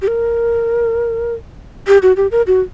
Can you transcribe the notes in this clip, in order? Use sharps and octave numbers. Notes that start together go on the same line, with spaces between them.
G4
A#4
G4
F#4
G4
A#4
F#4